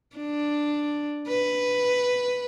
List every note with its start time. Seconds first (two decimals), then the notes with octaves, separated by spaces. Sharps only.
0.16 D4
1.28 B4